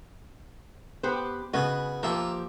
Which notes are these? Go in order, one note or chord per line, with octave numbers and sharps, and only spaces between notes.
B3 G4 B4 C5
C#3 B3 F#4 D#5 G#5 D#6
F3 A#3 G4 A#4 E5